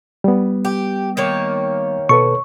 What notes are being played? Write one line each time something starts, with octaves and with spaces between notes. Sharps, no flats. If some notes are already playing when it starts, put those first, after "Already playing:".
G3 B3
G4
D#3 A#3 C#5
B2 A4 B4 C#6